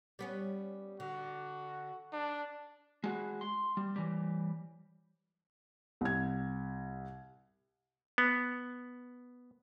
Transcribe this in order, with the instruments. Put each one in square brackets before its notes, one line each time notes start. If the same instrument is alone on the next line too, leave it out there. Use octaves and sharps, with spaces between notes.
[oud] G3 B3 C#4
[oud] D3 [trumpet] F#4
[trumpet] D4
[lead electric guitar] G#3 F#4
C6
G3
E3 G3
[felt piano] C2 G#6
[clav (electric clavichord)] B3